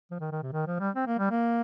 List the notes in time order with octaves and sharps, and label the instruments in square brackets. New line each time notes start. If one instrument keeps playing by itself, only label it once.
[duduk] F3
D#3
D#3
C3
D#3
F3
G3
C4
A#3
G3
A#3